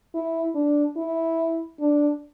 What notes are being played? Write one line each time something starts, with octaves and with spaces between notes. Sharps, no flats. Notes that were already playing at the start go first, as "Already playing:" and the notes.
E4
D4
E4
D4